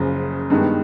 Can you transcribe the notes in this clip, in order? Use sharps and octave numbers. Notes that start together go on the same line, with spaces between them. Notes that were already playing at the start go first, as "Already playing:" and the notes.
Already playing: F#1 F#2 C#3 F3
G2 D#3 G#3 B3